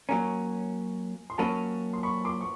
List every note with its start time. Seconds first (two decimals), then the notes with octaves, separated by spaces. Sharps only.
0.09 F#3 A#3 C#4 G#5 A#5
1.30 C6
1.38 F#3 A#3 C#4 A5 B5
1.93 C6
2.03 B5 C#6
2.25 C6 D6
2.41 C#6